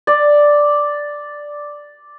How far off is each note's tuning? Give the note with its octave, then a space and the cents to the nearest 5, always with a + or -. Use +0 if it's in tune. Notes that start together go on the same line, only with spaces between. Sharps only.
D5 +0